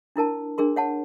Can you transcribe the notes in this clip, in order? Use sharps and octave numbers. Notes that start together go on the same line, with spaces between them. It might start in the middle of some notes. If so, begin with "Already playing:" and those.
D4 E4 A#4 A5
D4 G#4 A#4 C6
C#5 F#5 A5